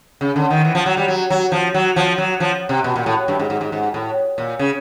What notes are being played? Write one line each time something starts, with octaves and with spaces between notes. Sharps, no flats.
C#3
D3
D#3
E3
F3
F#3
G3
F#3
F#3
F3
F#3
F3
F#3
F3
C3
B2
A#2
A2
G2
G#2
G#2
G#2
G#2
A2
A#2
C#3